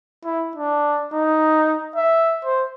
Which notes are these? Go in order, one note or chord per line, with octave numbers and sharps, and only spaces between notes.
E4
D4
D#4
E5
C5